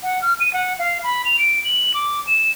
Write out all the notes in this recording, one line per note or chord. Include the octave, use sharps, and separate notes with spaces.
F#5
F6
D#7
F#5
F5
B5
F7
D7
F#7
D6
E7